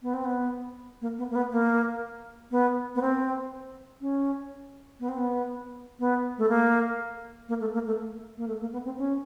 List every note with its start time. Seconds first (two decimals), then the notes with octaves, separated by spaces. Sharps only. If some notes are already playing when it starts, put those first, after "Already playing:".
0.02 B3
0.14 C4
0.25 B3
1.01 A#3
1.18 B3
1.30 A#3
1.35 B3
1.51 A#3
2.51 B3
2.95 B3
3.01 C4
4.01 C#4
5.00 B3
5.09 C4
5.18 B3
5.99 B3
6.38 A3
6.49 A#3
7.49 A#3
7.60 A3
7.74 A#3
7.86 A3
8.37 A#3
8.48 A3
8.61 A#3
8.72 B3
8.85 C4
8.98 C#4